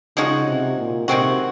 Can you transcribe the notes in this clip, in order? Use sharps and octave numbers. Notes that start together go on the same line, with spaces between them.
C#3 F3 G#3 D#4 F#4
C3
A#2
C3 D#3 G#3 C4 F#4